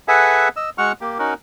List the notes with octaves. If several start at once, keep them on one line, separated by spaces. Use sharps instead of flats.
G#4 A4 B4 E5 F#5 G#5
D#5 E6
G#3 F#4 F#5 C#6 F6
A#3 G4
C#4 D#4 F#4 A#4